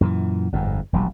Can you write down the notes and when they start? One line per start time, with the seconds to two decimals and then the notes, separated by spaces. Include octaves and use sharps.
0.01 F#2 A#2 C#3 E3
0.52 G1 F2 G#2
0.93 E1 A#1 F#3 G3